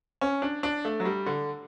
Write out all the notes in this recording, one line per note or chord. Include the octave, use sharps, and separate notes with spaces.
C#4
D4
D4
A3
F#3
G3
D3